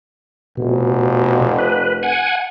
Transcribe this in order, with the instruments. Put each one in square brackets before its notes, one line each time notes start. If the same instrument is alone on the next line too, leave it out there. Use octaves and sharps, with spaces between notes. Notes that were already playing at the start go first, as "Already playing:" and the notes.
[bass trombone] F1 [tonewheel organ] B2
[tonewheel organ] B4
F#5 G#5